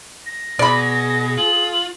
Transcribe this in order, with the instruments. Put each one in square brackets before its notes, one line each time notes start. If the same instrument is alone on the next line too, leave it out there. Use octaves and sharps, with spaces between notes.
[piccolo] A#6
[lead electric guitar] B2 [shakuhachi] G#4 [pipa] D5 B5
[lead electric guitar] F4 [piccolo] F#7